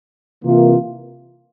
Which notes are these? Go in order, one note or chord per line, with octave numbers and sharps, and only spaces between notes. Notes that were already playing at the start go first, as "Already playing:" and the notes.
C3 E3 A#3 F4